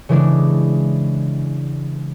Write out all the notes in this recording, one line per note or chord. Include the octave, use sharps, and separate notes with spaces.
C#3 E3 G#3 D4